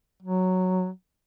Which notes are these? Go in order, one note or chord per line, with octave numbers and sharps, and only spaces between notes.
F#3